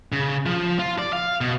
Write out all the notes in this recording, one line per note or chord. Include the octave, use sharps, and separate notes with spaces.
C#3
F3
F4
D5
F5
B2